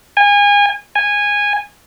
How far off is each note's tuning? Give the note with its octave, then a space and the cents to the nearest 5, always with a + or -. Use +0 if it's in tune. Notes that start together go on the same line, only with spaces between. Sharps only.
G#5 -30
G#5 -15